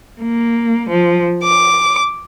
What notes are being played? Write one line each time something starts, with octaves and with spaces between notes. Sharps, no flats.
A#3
F3
D6